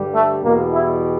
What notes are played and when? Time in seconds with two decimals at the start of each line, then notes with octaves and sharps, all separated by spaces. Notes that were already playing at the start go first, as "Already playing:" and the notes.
Already playing: G2 D3 G3
0.13 A3
0.42 E2 B2 G3 A#3
0.70 E4